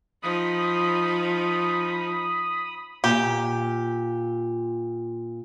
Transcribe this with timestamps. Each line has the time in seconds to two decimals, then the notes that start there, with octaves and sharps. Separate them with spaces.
0.23 F3 D#4 B5 D#6
3.04 A#2 G4